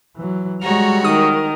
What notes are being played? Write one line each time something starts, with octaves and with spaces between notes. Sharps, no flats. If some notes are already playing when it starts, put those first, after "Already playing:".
E3 F#3
G3 G#3 F#4 C#5 A#5
D#3 A#4 D#6